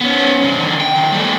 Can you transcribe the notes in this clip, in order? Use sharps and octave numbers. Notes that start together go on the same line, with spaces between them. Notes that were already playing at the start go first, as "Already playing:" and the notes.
B3 C#4
G2 C3
D3 D#3
G5
D#3 F3
G3 A3